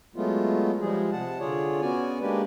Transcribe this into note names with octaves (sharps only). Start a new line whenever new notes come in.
F#3 G#3 A3 B3 F4
F3 G3 G#3 G#4
C3 F#5 A5
D3 F4 G#4 C#5 D5
B3 C#4 F#4 D5 G#5
G#3 A#3 D4 G4 B4 D5